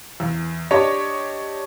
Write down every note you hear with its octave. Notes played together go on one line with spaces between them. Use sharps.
E2
D4 G4 C#5 D#5 A5 C#6